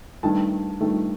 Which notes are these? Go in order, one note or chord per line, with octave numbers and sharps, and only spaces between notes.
G2 D#3 A3 A5
G2 D#3 A3